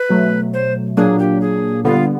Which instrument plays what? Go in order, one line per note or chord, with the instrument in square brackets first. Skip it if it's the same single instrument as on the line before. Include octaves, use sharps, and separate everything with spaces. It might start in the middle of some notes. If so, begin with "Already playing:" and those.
Already playing: [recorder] B4
[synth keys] B2 F#3 A3
[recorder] C5
[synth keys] A#2 F#3 A#3 D4 [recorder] G#4
[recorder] G4
G#4
[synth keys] D3 G3 B3 [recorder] F4